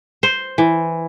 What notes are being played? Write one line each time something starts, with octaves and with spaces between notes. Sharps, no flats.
C5
E3